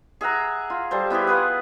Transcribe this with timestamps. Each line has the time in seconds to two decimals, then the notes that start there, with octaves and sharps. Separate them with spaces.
0.21 G#4 E5 F#5 A#5
0.70 F4
0.91 G3 A4 C5
1.10 B3 E4 G4 G#4
1.27 F4 B4 F#5